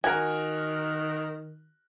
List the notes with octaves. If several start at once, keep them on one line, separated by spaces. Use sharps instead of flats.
D#3 F#4 A#4 G#5